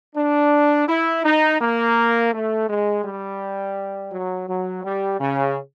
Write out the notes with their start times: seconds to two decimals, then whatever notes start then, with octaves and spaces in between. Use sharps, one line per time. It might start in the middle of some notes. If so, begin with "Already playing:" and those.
0.15 D4
0.88 E4
1.24 D#4
1.60 A#3
2.32 A3
2.68 G#3
3.04 G3
4.11 F#3
4.48 F#3
4.83 G3
5.20 C#3